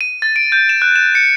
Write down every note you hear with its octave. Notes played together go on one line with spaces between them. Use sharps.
D#7
A6
D7
G6
E7
F#6
E7
C#7